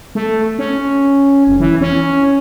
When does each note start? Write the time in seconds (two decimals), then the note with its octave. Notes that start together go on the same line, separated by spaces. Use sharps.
0.15 A3
0.59 C#4
1.47 F1
1.60 E3
1.81 C#4